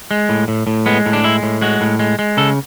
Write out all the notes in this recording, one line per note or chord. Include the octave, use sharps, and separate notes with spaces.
G#3
A2
A2
A2
G#3 B3
A2
D4
G#3 E4
A2
G#3 F#4
A2
G#3
G#3
C#3 A4